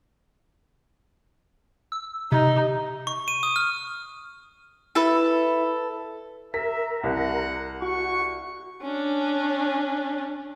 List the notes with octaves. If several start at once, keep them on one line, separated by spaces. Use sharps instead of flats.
E6
C3 D#4
C#6
D#7
D#6
F6
E4 A4 B4
A#4 E5 B6
C2 F#5
F#4 C#6
C#4 D4